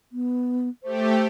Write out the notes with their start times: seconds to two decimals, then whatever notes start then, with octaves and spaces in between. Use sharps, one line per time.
0.12 B3
0.83 A3 G4 C5